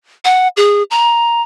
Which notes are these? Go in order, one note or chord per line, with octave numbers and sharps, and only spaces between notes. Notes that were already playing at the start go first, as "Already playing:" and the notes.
F#5
G#4
A#5